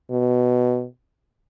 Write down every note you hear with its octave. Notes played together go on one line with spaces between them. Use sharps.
B2